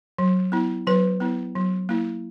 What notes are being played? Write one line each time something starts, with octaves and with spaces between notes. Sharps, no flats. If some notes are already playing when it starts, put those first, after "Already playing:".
F#3
B3 E4
F#3 B4
B3 E4
F#3
A#3 E4